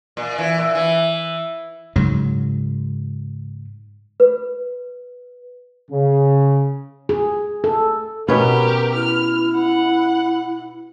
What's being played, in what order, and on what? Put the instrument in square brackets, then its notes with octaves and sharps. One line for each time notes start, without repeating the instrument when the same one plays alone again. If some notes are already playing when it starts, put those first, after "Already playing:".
[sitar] A#2
E3
A#2
E3
[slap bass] G#2 C#3 F#3
[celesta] B4
[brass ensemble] C#3
[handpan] G#4
A4
[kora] B2 B3 C#4 [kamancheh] G4 A#4 [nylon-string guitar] B4
[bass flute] E4 [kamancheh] F6
[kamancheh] F#5